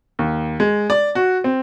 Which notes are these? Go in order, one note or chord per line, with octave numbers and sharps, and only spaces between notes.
D#2
G#3
D5
F#4
C4